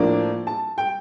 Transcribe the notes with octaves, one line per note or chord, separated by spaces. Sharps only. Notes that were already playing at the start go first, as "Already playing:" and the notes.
Already playing: A2 F3 A#3 D4 D5
A5
G5